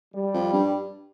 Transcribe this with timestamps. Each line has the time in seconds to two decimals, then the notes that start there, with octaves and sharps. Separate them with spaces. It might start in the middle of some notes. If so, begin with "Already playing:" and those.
0.14 G3
0.34 F2
0.53 G2